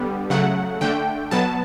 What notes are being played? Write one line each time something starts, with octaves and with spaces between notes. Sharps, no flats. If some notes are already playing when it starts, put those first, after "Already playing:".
Already playing: D3 G3 B3
C#3 F#3 A3 F#5
D3 A3 G5
B2 F#3 B3 A5